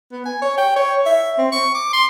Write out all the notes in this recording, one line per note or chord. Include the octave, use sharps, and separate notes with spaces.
B3
G#5
C#5
G5
C#5
E5
C4
C#6
D6
C6